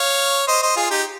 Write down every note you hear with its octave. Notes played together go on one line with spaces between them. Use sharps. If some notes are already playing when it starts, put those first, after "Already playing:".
Already playing: C#5 F5
C5 D#5
C5 D#5
F4 G#4
D#4 G4